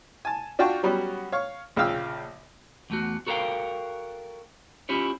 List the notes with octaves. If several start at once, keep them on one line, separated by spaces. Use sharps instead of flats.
G#5 A5
D4 F4 F#4 G5 A5 C#6
F#3 G3 B3 C#4 F#4
C#5 F5 C#6
A#1 C#3 F3 F5 G5 E6
E2 A3 F#4
F#4 A4 A#4 C#5 F5 G5
C#4 E4 F4 G4 C#5